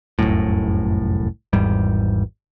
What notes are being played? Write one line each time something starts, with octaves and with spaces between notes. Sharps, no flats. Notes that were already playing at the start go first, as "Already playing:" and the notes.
F1 C2 F#2 A2
G#1 E2 G#2 G3